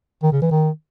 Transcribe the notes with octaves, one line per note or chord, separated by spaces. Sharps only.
D#3
C#3
E3
D#3